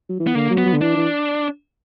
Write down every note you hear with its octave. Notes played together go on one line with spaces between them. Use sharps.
F#3
E3
B3
D3 A#3
F#3
B3
F#3
D3
E3 D4
E3